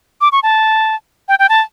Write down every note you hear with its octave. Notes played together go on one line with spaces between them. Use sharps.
D6
C#6
A5
G5
G5
A5